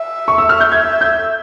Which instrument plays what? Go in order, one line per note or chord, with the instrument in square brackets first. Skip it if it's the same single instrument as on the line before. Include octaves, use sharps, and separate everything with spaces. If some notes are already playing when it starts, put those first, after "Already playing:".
Already playing: [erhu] E5
[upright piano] C#6
E6
F6
G6
[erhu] E5 [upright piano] G#6
[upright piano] G6